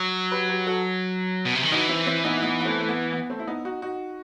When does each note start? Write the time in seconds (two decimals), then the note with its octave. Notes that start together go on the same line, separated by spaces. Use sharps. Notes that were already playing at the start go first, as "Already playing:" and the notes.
Already playing: F#3
0.32 G4 B4
0.49 G4 B4
0.67 F#4 A4
1.45 B2
1.54 C3
1.63 D#3
1.72 E3 D#4 F#4
1.89 C4 E4
2.06 C4 E4
2.24 B3 D#4
2.37 E4
2.43 B3 D#4
2.61 B3
2.65 A3 C4
2.81 A3
2.88 B3
3.12 B3
3.30 A3 C4
3.39 E4
3.47 B3 D#4
3.65 D#4 F#4
3.82 D#4 F#4